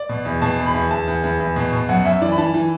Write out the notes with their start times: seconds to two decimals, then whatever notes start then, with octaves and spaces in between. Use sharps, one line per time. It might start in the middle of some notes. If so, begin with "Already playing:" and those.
Already playing: D5
0.09 B2
0.25 E2
0.42 B2 A5
0.58 E2
0.66 B5
0.74 E2
0.91 E2 A5
1.08 E2
1.24 E2
1.40 E2
1.56 B2
1.73 B2
1.89 F#2 F#5
2.05 F#2 E5
2.22 E3 D5
2.32 B5
2.38 E3 A5
2.54 E3